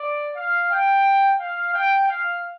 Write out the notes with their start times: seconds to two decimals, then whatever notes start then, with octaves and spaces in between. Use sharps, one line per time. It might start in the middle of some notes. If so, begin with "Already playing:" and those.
Already playing: D5
0.35 F5
0.70 G5
1.39 F5
1.73 G5
2.08 F5